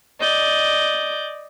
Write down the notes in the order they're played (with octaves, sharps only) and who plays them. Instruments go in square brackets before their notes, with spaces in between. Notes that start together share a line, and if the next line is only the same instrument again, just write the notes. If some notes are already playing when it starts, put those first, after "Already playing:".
[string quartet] D5 D#5 G6